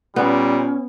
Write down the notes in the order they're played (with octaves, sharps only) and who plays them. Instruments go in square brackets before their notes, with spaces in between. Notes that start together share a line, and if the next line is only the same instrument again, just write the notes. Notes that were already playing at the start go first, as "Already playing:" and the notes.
[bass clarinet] A#2 [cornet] G3 [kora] B3 [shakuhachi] C#4